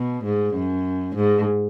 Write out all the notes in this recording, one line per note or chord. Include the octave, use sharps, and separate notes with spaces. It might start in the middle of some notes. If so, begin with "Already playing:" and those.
Already playing: B2
G#2
F#2
G#2